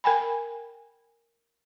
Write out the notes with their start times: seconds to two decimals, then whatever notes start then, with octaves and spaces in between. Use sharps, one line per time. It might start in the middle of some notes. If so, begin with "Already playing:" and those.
0.04 A#4 G5 G#5 B5